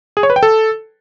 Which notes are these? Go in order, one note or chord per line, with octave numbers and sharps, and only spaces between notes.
G#4
C#5
B4
G5
A4